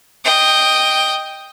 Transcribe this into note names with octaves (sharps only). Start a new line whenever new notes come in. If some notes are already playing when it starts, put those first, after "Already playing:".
D#5 G5